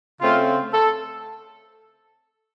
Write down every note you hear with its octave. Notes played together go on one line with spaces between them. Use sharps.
C#3 A3 C4 F4
A4